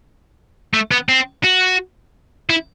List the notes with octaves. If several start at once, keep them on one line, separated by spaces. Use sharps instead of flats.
A3
B3
C4
F#4
E4